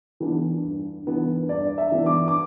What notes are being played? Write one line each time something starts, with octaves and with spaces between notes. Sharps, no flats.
E3 B3 D4
G2
E3 B3 D4
G2 D5
E5
E3 B3 D4
D6
D6